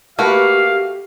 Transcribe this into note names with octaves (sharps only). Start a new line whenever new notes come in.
A3 A#3 F#4 G4 B4 F5